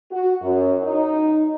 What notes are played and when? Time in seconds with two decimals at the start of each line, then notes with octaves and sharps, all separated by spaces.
0.11 F#4
0.42 F#2
0.83 D#4